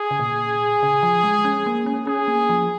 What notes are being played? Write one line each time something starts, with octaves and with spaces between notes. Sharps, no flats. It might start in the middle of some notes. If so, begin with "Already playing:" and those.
Already playing: G#4
C#3
A#2
C#3
F3
G#3
C#4
A#3
C#4
C#4 G#4
A#3
F3